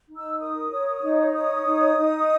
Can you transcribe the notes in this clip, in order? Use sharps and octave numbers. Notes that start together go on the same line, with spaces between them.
D#4
E6
A#4 D#6
C#5
D#4
C#5 D#6
D#4
D#4